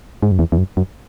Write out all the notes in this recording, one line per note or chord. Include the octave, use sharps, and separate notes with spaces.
G#2
F#2
E2
E2
F#2
F#2